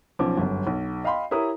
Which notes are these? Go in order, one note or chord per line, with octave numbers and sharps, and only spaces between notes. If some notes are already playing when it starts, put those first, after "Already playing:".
B1 F3 C#4 D6
G1 F#2
B1
D#5 F5 G5 B5 C6
E4 G4 A#4 C#5 A#5 D#6